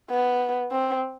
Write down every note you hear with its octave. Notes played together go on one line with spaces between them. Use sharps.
B3
C4